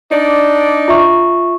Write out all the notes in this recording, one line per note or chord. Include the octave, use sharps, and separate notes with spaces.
D4 D#4 D5
F4 E5 C#6